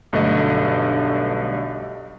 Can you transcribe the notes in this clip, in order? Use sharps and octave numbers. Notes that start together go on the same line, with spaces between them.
B1 G2 D3 A3 D#5